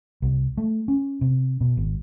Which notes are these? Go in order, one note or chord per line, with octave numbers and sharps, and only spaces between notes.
C2
A3
C#4
C3
B2
G#1